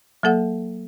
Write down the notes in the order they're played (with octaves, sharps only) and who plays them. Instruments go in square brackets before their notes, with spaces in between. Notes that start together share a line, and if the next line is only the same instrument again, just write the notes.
[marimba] F#3 A#3 A4 F#5